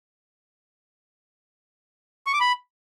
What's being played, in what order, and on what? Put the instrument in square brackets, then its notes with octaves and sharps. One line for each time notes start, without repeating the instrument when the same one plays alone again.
[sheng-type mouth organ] C#6
D6
B5